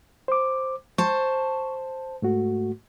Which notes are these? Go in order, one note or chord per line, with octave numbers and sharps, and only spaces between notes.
C5 D6
C5 A5 C#6
G#2 A3 F#4